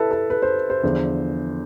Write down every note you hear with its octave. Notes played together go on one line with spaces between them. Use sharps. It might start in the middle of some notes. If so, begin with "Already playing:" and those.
Already playing: E4 A4 B4
A4
B4
C5
C5
E2 D3 F3